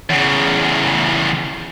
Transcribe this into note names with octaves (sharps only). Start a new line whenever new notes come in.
E2 C#3